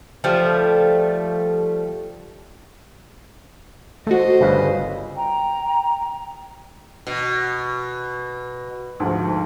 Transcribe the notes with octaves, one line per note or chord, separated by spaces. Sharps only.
F3 G3 A3
A3 F#4 C5 D#5
G1 C#3 B4
G5 A#5
B2
D2 G#2 F3